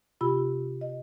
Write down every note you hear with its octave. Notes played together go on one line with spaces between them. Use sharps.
C3 F4 G4 B5 E6
D#5